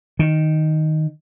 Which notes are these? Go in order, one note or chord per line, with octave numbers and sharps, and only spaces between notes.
D#3